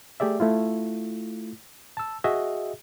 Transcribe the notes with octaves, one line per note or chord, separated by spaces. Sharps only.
A3 G4 G#4 D5 E5
A3 E4 F4
A5 E6
F#4 G#4 D#5 E5